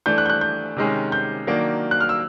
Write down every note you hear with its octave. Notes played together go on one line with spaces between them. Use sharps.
E3 A3 D4 G6
F#6
G6
F#6
G6
C3 D#3 G#3 C#4
G6
D#3 F#3 A#3 D4
F#6
F6
E6